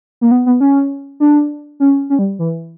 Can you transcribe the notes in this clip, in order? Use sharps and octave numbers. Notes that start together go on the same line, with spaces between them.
A#3
B3
B3
C#4
D4
C#4
C#4
G3
E3